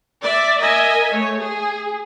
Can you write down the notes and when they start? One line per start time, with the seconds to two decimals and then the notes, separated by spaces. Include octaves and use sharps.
0.22 D5 E5
0.59 A#4 D#5 E5 G#5
1.12 A3 C#5
1.40 G#4